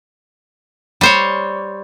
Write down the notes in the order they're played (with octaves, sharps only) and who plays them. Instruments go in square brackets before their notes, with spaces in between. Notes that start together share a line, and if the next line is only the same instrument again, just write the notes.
[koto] G3 C5 C#5